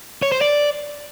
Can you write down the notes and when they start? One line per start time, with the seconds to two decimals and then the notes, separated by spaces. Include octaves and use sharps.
0.22 C#5
0.32 C5
0.41 D5